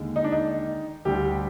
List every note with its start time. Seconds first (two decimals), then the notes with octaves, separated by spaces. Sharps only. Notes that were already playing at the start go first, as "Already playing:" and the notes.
Already playing: D#2 D3 G#3
0.16 D#4
0.24 D4
0.32 D#4
1.05 D2 D3 G3 G4